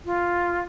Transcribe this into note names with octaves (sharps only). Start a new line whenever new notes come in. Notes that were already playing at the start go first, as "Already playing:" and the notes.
F4